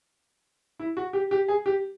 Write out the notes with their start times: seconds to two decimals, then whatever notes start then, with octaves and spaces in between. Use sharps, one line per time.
0.79 E4
0.97 F#4
1.13 G4
1.31 G4
1.48 G#4
1.66 G4